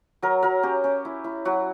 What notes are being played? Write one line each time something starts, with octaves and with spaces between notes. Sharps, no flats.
F#3 A#4
F#3 A#4
C#4 G4
C#4
E4
E4
F#3 F#4